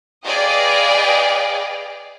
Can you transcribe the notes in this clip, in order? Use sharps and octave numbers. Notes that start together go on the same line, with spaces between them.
G#4 B4 D5 D#5 F5 G5